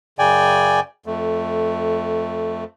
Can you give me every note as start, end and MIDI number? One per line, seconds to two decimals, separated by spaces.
0.19 0.80 42
0.19 0.80 49
0.19 0.80 74
0.19 0.80 79
0.19 0.80 80
1.06 2.64 41
1.06 2.64 57